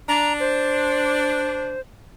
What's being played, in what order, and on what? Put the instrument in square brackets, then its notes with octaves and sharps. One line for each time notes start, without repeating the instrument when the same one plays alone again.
[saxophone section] D4 [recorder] A#5
[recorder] C5